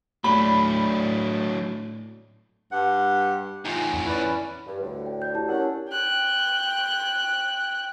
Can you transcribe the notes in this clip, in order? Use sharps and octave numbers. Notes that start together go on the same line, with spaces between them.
A2 F#3 D4 B5
G2 G4 F#5
E2 A2 D#4 F4 G5 G#5
F2
C#4 E4 B4 D5
G2
D2 A2 D3
G5
D5 G6
E4 G4 A5
C#4 D4 E4 G4 A#4 F#5
G5 F#6